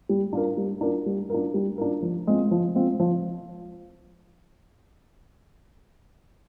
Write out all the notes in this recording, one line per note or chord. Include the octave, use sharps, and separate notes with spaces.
G3
D4 F4 A#4
G3
D4 F4 A#4
G3
D4 F4 A#4
G3
D4 F4 A#4
F3
G#3 C4 F4
F3
G#3 C4 F4
F3